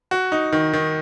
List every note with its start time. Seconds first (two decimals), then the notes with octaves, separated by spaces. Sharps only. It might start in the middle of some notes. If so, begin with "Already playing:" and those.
0.11 F#4
0.32 D#4
0.52 D#3
0.73 D#3